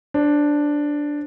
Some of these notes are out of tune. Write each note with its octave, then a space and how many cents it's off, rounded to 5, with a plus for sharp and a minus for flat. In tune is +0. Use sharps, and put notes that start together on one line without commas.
D4 +0 C5 +25